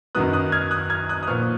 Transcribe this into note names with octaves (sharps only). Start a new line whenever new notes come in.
F#2 D#3 F#3 B3 D#6 F#6
D#6 F#6
F6 G#6
D#6 F#6
F6 G#6
D#6 F#6
D#6
A#2 F3 B3 C#6 F6